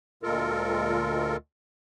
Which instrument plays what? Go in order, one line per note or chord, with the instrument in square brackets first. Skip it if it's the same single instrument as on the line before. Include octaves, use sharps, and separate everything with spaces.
[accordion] D2 A#2 G#3 F4 A4 A#4